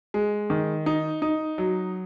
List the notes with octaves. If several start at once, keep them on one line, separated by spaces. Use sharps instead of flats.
G#3
D#3
D#4
D#4
F#3